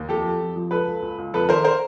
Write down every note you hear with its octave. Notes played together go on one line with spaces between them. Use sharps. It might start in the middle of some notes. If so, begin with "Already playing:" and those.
Already playing: D#2
F2 G4 A4
F3
F2
F3
C#2 A4 B4
C#2
C#2
C#2
F2 A4 B4
D#3 A#4 C5
A#4 C5